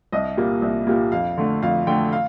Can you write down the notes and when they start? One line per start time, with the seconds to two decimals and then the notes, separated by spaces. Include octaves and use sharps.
0.12 C2 D#5
0.37 A#2 G3 A#3
0.62 C2
0.87 A#2 G3 A#3
1.12 F2 F5
1.37 D3 A3
1.62 F2 F5
1.87 D3 A3 G5
2.12 F5